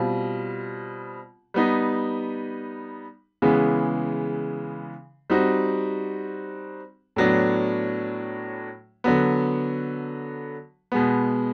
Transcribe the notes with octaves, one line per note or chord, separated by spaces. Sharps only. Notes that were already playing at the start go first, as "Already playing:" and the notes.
Already playing: B2 G3 C4 F4
G3 B3 D#4
C#3 E3 G#3 B3
G3 C4 D#4 F#4
A2 F#3 B3 D4
D3 F#3 B3
B2 G#3 B3